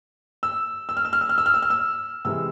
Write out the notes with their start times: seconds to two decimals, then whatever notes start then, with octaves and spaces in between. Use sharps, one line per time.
0.43 E6
0.89 E6
0.97 F6
1.05 E6
1.13 F6
1.21 E6
1.29 F6
1.38 E6
1.46 F6
1.54 E6
1.62 F6
1.70 E6
2.25 C3 E3 G#3 E6